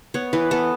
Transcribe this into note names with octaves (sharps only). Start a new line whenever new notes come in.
B3 C#5
E3 B4
B3 A4